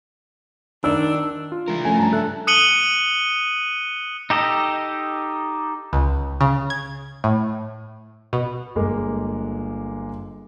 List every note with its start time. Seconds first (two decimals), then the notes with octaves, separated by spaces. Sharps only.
0.84 D#3 D4 D#4 E6
1.52 F4
1.68 E3 G#3 D4 E4 A#4
1.85 F3 A3 C#4 G#5
1.99 G2 D4 A5 A#5
2.13 C#3 A4 E5 F#6
2.47 D#6 F#6 C#7 D#7 F#7 G7
4.30 D#4 G4 A4 D#5
5.93 C#2
6.41 C#3
6.70 G#6
7.24 A2
8.33 B2
8.75 G1 G#3 A#3 D6